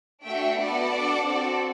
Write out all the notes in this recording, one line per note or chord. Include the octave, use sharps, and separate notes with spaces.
A3 D4 F#4 E5 G5
B3 F#4 A4 D5 F#5
D4 F#4 A4
C4 F#4 A4